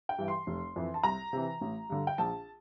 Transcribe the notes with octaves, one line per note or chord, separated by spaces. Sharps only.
G5
G2 E3
C6
F1
F2 E3
A5
C2 A#5
C3 E3
A1
G2 D3
G5
A#1 A5